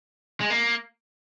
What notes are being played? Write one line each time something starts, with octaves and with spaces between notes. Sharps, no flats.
G#3
A#3